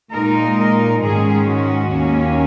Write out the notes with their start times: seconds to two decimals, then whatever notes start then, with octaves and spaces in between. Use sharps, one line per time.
0.11 A#2 G#3 D#4 A#4
0.56 A#4
1.00 G#2 D#3 G#3 C#4 G#4
1.45 F#4
1.90 D#2 D#3 A#3 C#4